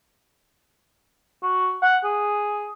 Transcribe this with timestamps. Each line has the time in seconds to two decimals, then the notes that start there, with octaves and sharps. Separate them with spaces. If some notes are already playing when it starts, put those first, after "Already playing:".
1.43 F#4
1.82 F#5
2.04 G#4